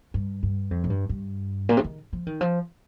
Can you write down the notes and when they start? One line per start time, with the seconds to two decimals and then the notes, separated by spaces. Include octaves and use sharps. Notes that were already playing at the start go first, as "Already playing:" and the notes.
0.14 G2
0.43 G2
0.71 F2
0.84 A#2
0.90 G2
1.09 G2
1.69 A#2
1.77 C3
1.84 D#3
2.13 F3
2.27 D#3
2.41 F3